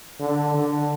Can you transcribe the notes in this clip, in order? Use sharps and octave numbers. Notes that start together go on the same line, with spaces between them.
D3
D3